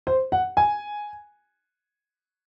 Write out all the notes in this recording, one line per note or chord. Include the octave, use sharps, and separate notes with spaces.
C5
F#5
G#5